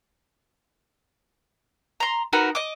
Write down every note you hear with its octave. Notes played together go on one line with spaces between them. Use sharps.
A#5 C6
D#4 F#4 A#4 B4
D#5 D6